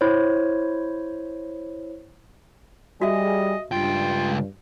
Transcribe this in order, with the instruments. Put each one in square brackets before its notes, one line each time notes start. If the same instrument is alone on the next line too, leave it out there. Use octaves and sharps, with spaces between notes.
[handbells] E4 C5 C#5
[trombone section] G3 G#4 [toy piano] F#4 E5 [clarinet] D#5
[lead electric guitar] C#2 G5 [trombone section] G2 [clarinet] F4